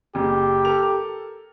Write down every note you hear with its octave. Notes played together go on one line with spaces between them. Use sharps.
F#1 G4
A4 A#4 F7